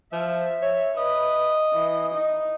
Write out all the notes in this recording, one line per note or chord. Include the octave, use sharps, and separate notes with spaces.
F3 E5
C#5
B4 D#5
E3
D#4